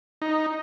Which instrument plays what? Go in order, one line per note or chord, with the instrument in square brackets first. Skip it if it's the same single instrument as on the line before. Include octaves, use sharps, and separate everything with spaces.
[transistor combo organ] D#4